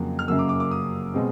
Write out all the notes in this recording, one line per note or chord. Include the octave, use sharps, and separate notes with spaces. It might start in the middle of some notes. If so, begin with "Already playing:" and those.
Already playing: F2 C#3 F#3 A#3
F6
F#2 C#3 F#3 A#3 E6
D6
D6
D6
D#6
B2 G#3 C4